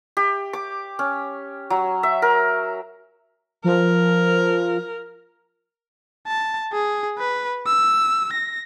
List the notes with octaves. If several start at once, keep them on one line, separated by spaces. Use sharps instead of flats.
G4
D6
C#4
F#3
E5
A#4
F3 A#4
A5
G#4
B4
E6
A#6